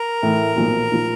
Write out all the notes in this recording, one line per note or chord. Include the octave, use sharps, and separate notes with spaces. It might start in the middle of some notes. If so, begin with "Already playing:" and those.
Already playing: A#4
A2 E3 A3
B1 A#2 F3
A#2 F3